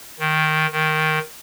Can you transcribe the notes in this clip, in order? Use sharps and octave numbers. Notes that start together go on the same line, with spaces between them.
D#3
D#3